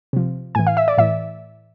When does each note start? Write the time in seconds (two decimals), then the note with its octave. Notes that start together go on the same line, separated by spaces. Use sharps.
0.13 C3 F3
0.55 A2 E3 G#5
0.67 F5
0.77 E5
0.88 D5
0.98 A2 E3 E5